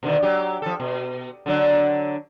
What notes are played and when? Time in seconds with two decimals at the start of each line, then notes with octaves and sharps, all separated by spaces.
0.03 B2 D3 D#3
0.22 F#3 G4
0.62 F3 A4
0.80 B2
1.46 D3 F#3 D4